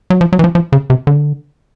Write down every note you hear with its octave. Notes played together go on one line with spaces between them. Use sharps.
F#3
F3
F#3
E3
F3
F3
C#3
C3
D3